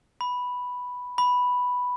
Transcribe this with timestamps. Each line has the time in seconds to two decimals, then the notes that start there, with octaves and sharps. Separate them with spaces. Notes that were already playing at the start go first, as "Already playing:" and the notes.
0.21 B5
1.18 B5